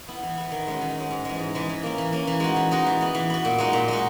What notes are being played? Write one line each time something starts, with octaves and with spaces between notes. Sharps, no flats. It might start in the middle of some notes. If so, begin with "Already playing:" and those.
B3 E4
E3
B3 E4
D#3
G#3 C#4 F#4
D#3
G#3 C#4 F#4
G#2
E3 G#3
G#2
E3 G#3
E3
A#3 C#4
E3
A#3 C#4
E3
G#3 D#4 F#4
E3
G#3 D#4 F#4
E3
B3 F#4
E3
B3 F#4
A#2
G#3 D#4 F#4
A#2
G#3 D#4 F#4